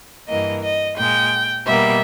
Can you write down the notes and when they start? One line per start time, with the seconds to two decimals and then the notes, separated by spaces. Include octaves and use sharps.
0.28 G2 E3 A#3 D#5
0.63 D#5
0.97 A#2 G#3 G5
1.67 B2 G3 A#3 E5